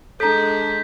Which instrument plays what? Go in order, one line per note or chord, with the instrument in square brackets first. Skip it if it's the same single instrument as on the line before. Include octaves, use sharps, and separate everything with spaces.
[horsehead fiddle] G#3 D4 [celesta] A4 A#5 [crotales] G6 B6